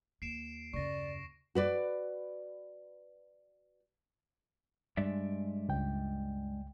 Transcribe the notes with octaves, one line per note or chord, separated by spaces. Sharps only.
D#2 A#3 C7 D7 E7
F#2 C#3 D5 C#6 A#6
F#4 B4 D5
G2 G#3 D5 E5
C#2 G5